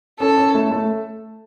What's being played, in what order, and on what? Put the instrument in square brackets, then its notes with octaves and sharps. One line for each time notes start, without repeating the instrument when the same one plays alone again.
[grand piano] C#4 [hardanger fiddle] A4
[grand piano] C#4
A3
A3